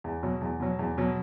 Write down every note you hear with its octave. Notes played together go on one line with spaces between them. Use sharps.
E2
B2 F#3
E2
B2 F#3
E2
B2 F#3